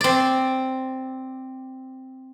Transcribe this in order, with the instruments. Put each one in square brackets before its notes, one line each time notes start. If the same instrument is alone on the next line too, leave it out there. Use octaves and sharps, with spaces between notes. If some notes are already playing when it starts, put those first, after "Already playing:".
[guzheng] C4 D5